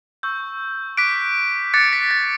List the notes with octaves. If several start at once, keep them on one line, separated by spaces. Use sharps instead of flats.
C#6 E6 G6
D6 F#6 B6 D7
D6 F#6 A6 C#7
B6
A6